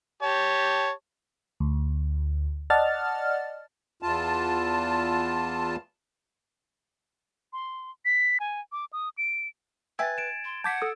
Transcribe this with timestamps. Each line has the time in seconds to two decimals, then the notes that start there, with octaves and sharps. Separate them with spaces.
0.22 G4 C#5 A5
1.60 D2
2.70 D5 D#5 F#5 A5 F6 A6
4.02 E2 F4 A5
7.53 C6
8.05 B6
8.40 G#5
8.72 D6
8.93 D#6
9.18 D7
9.99 B4 E5 G5 G#5 E6 G#6 A6
10.18 D7 E7
10.45 C6
10.64 F#5 A5 D6 G6 G#6 B6
10.82 A4 D#6 E6